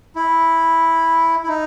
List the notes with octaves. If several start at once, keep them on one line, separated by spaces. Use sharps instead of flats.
E4
E4
D#4